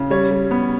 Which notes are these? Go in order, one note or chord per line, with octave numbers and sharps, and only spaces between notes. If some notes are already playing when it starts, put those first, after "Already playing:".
Already playing: C#3
G3 C#5
G3
B3